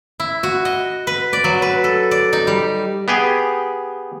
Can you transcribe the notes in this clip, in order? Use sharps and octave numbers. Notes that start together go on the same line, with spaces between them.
E4
F#4
D#5
B4
D5
F#3
B4
A4
D5
D#4
G3
B3 G4 G#4 G5